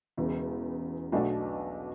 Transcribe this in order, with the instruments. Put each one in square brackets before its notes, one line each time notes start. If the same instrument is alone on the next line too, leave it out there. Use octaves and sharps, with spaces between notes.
[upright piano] E1 E2 C#3
B1 B2 A3 D4 F#4